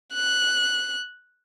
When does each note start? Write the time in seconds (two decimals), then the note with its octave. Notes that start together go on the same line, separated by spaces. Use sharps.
0.13 F#6